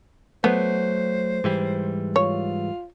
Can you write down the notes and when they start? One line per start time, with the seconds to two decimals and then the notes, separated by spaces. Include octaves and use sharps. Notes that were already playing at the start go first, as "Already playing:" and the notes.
0.44 F#3 A3 B3 C5
1.44 G#2 E3 G3
2.16 F4 C#5